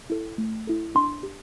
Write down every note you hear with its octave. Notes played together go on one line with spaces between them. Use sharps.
E4 A4
A3
E4 A4
D4 C6
G4